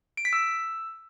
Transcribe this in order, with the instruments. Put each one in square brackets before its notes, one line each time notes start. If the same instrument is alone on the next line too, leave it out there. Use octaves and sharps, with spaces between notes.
[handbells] D7
B6
E6